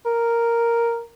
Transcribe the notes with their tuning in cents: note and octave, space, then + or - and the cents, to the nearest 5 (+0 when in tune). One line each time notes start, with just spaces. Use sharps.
A#4 +0